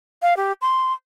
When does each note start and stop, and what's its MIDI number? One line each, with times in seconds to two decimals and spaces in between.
0.22 0.37 77
0.37 0.52 67
0.62 0.93 84